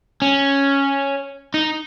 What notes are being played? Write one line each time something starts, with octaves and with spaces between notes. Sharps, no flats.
C#4
D#4